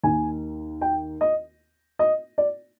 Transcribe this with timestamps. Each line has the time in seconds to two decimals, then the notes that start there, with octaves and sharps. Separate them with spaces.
0.03 D#2 D#3 G#5
0.81 G5
1.21 D#5
1.99 D#5
2.38 D5